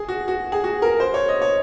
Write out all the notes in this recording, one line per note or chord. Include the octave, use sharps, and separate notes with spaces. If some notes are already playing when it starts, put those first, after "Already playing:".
Already playing: G#4
F#4
F#4
G#4
F#4
A#4
C5
C#5
D#5
C#5